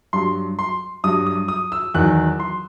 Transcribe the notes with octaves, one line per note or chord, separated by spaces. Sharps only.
G2 F#3 C6
C6
G2 F#3 D#6
D#6
D#6
E6
E2 D#3 F#3 F#6
C6